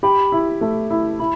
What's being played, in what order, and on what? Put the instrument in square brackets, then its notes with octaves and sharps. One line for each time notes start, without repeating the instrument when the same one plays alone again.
[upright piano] G4 [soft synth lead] B5
[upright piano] E4
A3
E4
[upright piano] E4 [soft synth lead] B5